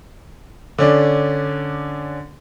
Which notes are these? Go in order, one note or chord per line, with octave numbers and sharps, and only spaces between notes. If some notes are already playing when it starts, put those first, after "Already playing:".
D3 C#4 D4